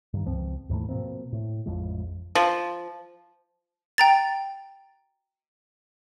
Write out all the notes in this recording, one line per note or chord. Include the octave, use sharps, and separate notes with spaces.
G2 D#3
C#2 F3 C4
D#2 G#2 E3 A3
B2 F3 A#3 C4
A2
A1 F2 F3 G#3
F3
G5 A#5 A6